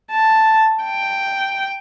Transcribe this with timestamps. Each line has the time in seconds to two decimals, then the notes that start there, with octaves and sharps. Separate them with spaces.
0.12 A5
0.84 G5